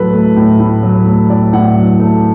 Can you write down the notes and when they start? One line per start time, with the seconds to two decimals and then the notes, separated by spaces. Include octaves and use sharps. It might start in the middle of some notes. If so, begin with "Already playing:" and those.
Already playing: A2 F#3 A4 B4
0.13 A3
0.36 A2
0.59 A2
0.83 F#3
1.06 A3
1.30 A2 D5
1.53 A2 F#5
1.76 F#3
2.00 A3